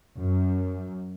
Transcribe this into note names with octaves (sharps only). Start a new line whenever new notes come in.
F#2